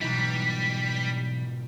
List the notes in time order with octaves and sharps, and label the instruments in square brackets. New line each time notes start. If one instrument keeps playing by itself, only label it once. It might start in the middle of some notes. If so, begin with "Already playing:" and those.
[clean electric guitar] B1 E3 D#4 [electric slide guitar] G#2 B2 F#4 [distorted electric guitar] G3 [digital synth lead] B6